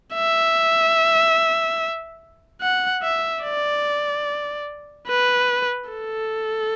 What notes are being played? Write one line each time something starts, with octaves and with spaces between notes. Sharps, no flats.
E5
F#5
E5
D5
B4
A4